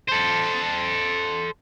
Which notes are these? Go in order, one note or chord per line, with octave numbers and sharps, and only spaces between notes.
A4 C5